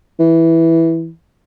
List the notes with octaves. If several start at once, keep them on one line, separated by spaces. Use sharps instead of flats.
E3